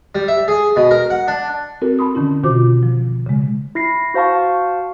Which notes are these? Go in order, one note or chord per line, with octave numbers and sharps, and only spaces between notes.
G3
E5
G#4
B2
A#4
F#5
D4
C4 E4 F#4 A4 A#4
A5 B5 C6 D#6
D3 D#3 C#4 E4
B2 D#3 F4 F#4 C5 D6
F3
C#3 G#3
E4 A#6 C7
F#4 C5 F5 A5 C#6